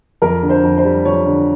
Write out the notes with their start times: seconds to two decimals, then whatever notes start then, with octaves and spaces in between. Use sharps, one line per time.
0.22 F2 A#4
0.43 D3
0.49 C5
0.63 F2
0.77 C5
0.85 G3
1.05 F2 C#5
1.26 D3